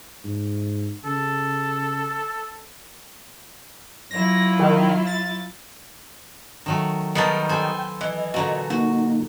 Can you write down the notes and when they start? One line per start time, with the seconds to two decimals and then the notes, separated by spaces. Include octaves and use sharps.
0.24 G#2
1.05 C#3 A4
4.11 F#3 E4 F4 A#6
4.59 D#3
5.07 A6
6.66 D#3 F#3 A3
7.15 D#3 G3 B3 D#4 A#4 A5
7.49 A4 C5 G5 G#5 G6
8.01 E3 D#5 G#6
8.34 A#2 D3 F#3 F#4 A#5
8.70 A#3 D#4 F#4